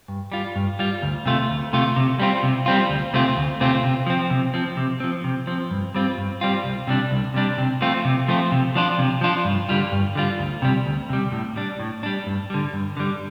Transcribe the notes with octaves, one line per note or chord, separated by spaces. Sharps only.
G2
G3 F4
G2
G3 F4
D2
C3 A3 F4
D2
C3 A3 F4
C3
G3 C4 F4
C3
G3 C4 F4
D2
C3 A3 C4 F4
D2
C3 A3 C4 F4
C3
F3 C4
C3
F3 C4
C3
F3 C4
C3
F3 C4
G2
G3 C4 F4
G2
G3 C4 F4
C2
C3 G3 D4
C2
C3 G3 D4
C3
F3 A3 C4 F4
C3
F3 A3 C4 F4
C3
F3 D4 F4
C3
F3 D4 F4
G2
D3 G3 F4
G2
D3 G3 F4
D2
C3 G3
D2
C3 G3
A2
G3 D4
A2
G3 D4
G2
D3 G3
G2
D3 G3